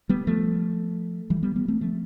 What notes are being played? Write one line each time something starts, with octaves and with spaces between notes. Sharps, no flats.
G3 B3
F3 A3
E3 G3
G3 B3
G3 B3
A3 C4
F3 A3